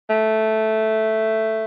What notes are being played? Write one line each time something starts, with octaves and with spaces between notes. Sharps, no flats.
A3